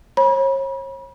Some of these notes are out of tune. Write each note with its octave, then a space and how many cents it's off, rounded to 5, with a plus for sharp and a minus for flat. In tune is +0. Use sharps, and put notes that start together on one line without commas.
C#5 -40 B5 -40